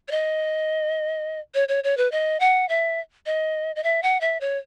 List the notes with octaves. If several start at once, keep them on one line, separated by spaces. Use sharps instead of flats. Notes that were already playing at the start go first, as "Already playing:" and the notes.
C#5
D#5
C#5
C#5
C#5
B4
D#5
F#5
E5
D#5
D#5
E5
F#5
E5
C#5